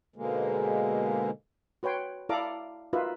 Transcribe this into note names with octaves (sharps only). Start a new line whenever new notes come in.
G#2 B2 D3 G#3 A#3
F#4 B4 C#5 G5 C6
E4 A4 D5 F5 A#5 D6
D#4 F4 F#4 A#4 B4 E5